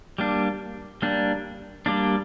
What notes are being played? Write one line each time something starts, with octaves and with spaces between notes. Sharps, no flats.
G3 A#3 D4
G3 A#3 D4
G3 A#3 D4